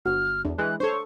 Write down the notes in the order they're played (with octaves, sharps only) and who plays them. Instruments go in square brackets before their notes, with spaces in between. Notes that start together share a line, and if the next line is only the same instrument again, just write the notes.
[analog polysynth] G1 [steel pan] F#4 [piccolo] F6
[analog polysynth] E2 [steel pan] D4
[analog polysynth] E3 G#3 [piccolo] F#6
[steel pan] D4 A4 [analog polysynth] C5 C#5 [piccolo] C#6